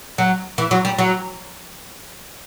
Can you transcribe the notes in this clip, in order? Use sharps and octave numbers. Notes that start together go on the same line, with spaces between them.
F#3
E3
F#3
G3
F#3